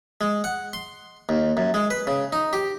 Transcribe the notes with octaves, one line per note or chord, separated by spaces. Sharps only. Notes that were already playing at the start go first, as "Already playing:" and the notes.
G#3
F#5
C6
D#2
F#2
G#3
B4
C#3
D#4
G4